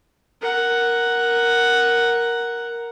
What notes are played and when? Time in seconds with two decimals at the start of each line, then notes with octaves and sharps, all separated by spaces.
0.41 A#4 F#5